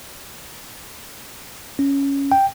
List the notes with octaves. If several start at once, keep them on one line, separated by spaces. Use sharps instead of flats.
C#4
G5